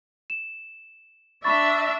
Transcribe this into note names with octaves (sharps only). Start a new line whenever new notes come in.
E7
D4 E5 B5 C#6 A6